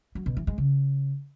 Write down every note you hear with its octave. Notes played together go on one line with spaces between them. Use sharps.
F#3
B2
E3
G#3
C#3